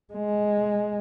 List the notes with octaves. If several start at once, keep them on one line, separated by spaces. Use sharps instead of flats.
G#3